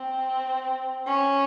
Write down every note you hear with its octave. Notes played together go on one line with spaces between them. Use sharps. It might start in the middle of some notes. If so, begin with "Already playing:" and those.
Already playing: C4
C#4